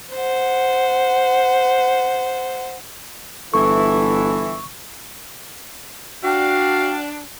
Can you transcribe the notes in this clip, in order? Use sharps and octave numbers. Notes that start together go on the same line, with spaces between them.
C5 F#5
G1 E3 E4 A4 C#6
D4 F#4 F5 G5